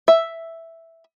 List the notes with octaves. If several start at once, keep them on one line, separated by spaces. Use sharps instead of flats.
E5